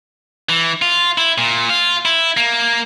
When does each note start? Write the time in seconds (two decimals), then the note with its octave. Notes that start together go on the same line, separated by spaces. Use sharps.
0.49 E3
0.82 F4
1.18 E4
1.38 A#2
1.69 F4
2.05 E4
2.37 A#3